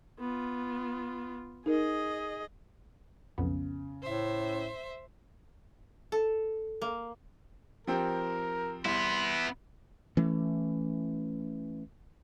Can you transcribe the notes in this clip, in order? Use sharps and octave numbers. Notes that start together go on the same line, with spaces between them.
B3 F4
D#4 G#4 A#4 D#5
B1 F2 C#3 B3
A2 C5 E5
A4
A#3
F3 C4 G4 A#4
C2 B3 E4 C6
E3 A3 C#4